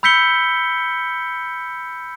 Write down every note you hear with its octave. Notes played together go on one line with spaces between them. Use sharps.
B5 E6 G6 B6 C#7 G7